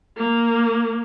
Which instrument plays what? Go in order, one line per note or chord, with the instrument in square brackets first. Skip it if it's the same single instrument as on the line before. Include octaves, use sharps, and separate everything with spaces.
[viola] A#3